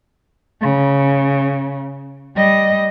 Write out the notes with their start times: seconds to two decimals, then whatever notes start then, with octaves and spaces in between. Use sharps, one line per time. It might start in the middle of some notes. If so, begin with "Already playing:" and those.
0.61 C#3
2.36 G3 D#5